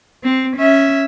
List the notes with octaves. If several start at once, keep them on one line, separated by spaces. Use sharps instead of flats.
C4
C#4 E5